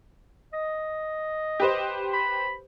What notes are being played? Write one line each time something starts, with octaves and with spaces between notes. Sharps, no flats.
D#5
G4 B4 C5
B5